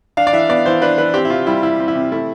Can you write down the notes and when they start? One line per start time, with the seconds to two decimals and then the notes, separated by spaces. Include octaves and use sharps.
0.17 D4 F5
0.27 D5
0.33 E3 E5
0.49 B3 D5
0.66 E3 C5
0.82 D4 B4
0.98 E3 B4
1.14 C4 G4
1.25 E4
1.30 C3 F4
1.47 G3 E4
1.63 E4
1.80 C4
1.88 E4
1.95 C3
2.12 A3 E4